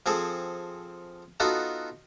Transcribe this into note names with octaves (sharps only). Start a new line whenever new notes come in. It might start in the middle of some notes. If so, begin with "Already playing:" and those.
F3 C4 G#4 A4
B3 D#4 F4 F#4 A4